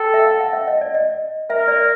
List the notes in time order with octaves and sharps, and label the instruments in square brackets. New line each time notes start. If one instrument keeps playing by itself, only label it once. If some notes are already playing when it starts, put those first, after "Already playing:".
Already playing: [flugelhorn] A4 [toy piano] G5
[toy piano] E5
F5
F#5
E5
D#5
D5
D#5
[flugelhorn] A#4 [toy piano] E5
[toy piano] D5